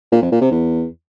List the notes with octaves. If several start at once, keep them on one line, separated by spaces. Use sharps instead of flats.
A#2
F2
A#2
C3
E2